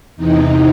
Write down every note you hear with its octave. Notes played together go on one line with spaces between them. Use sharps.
E2 C3 E3 D#4